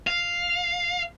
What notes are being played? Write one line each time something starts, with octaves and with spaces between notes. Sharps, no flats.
F5